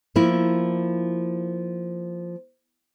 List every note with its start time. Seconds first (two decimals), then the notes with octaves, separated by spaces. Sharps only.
0.16 F3 A#3 E4